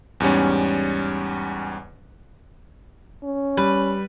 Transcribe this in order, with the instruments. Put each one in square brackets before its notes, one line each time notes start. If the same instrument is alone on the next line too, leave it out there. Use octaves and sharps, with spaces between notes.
[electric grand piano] E2 G#2 G3 C#4
[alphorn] C#4
[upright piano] G3 [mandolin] B4